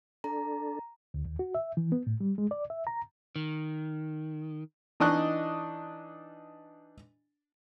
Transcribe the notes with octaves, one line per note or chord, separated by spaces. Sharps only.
D4 A4 A#5
D2
D#2
F#4
E5
E3
B3
A2
G3
G#3
D5
E5
A#5
D#3
E3 D4 D#4 D#5 C#6 F#6